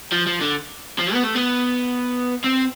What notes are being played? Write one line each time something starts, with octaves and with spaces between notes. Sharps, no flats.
F3
F3
D3
F3
B3
A3
B3
C4